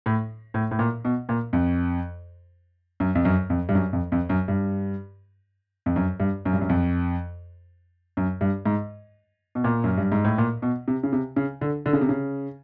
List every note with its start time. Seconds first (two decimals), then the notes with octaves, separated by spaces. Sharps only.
0.06 A2
0.54 A2
0.71 A2
0.79 A#2
1.05 B2
1.29 A#2
1.53 F2
3.00 F#2
3.15 F2
3.25 F#2
3.50 F2
3.69 G2
3.75 F#2
3.93 F2
4.12 F2
4.29 F#2
4.48 G2
5.86 F2
5.96 F#2
6.20 G2
6.45 F#2
6.53 G2
6.61 F#2
6.69 F2
8.17 F#2
8.41 G2
8.66 G#2
9.55 B2
9.64 A#2
9.84 F#2
9.98 G2
10.12 G#2
10.24 A2
10.38 A#2
10.62 B2
10.88 C3
11.03 C#3
11.12 C3
11.36 C#3
11.61 D3
11.86 D3
11.93 C#3
12.01 C3
12.09 C#3